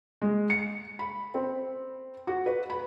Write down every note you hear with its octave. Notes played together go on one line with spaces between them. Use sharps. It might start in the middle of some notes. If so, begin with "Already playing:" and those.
G#3
C#7
B5
C4
F#4
B4
B5